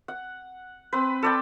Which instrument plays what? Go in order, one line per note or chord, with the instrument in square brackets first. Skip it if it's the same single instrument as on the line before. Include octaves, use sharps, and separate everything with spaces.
[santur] F#5
C4 B4
A4 D5 G5